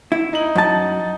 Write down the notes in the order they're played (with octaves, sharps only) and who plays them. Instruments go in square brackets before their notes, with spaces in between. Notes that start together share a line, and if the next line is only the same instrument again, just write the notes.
[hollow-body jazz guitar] E4
[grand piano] D#4 F#7
[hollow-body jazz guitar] F#2 A5